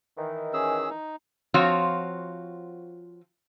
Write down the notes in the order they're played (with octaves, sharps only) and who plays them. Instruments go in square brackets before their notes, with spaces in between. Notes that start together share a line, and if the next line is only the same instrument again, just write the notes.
[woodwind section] D#3 E3
[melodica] C#4 G#4 E6
D#4
[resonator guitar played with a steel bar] F3 C4 F4 F#4 C#5